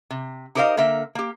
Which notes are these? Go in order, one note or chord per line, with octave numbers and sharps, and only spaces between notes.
C3
D#4 G4 A#4 C5 D#5 F5
D3 A#3 A#4 E5
A#3 G4